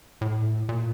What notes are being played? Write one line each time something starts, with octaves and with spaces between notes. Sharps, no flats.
A2
A#2